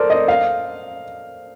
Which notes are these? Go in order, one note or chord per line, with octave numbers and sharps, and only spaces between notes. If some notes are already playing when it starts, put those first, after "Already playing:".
Already playing: A4 A#4 C5 D5
D#5
F5